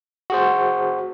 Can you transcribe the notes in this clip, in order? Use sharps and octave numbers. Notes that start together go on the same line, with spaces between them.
F#4 G#4 C5